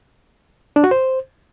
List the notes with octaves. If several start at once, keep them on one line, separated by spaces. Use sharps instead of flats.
D4
F#4
C5